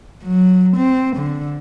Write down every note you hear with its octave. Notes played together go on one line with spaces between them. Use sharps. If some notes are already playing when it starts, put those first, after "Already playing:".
F#3
C4
D3